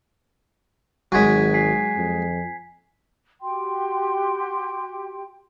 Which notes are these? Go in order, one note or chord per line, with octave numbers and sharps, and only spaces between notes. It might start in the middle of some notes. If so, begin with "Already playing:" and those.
G#1 F#3 G#3 G#5 G#6 B6
G#5 B6 C7
F2
F#4 G4 G5 C6